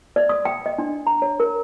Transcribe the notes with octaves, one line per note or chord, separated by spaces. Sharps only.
D5
D#6
G5
D#5
D4
A#5
C#5
A#4